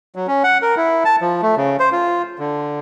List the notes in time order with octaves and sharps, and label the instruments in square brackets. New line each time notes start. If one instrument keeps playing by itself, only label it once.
[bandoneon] F#3
C#4
F#5
A#4
E4
A5
F3
A3
C#3
C5
F4
D3